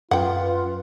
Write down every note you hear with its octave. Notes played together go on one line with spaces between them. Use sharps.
F#2 F4 B4 F#5 G5